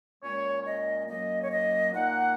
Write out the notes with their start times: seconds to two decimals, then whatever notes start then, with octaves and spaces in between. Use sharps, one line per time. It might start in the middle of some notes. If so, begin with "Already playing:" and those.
0.23 A#2 G#3 C#4 C#5
0.62 C#5
0.65 D#5
1.08 F#2 F#3 A#3 D#5
1.42 C#5
1.51 D#5
1.93 A#2 A#3 D#4 F#5